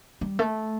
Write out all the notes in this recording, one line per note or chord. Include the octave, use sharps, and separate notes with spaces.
G3
A3